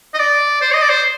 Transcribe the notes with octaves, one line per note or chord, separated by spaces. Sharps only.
D#5
D5
C5
D#5
D5
C5